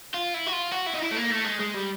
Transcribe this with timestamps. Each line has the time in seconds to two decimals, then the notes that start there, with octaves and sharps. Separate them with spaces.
0.14 F4
0.34 E4
0.47 F#4
0.53 F4
0.72 F#4
0.87 E4
0.94 D#4
1.02 E4
1.12 A3
1.16 A#3
1.31 A3
1.45 G#3
1.60 G#3
1.75 G3